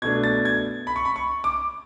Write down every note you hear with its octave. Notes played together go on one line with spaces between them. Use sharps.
B2 A3 D4 G#6
A6
G#6
B5
C#6
B5
C#6
D6